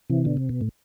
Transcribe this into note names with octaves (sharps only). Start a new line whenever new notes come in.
C3 E3
B2 D3
C3
B2
A2